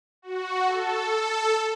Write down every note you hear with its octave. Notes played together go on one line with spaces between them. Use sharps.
F#4
A4
A4